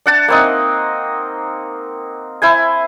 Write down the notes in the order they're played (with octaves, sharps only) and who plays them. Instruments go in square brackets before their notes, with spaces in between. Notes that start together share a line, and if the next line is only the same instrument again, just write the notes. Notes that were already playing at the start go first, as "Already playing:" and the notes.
[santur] D4 F#5 A5
A#3 C4 D#4
E4 C5 G#5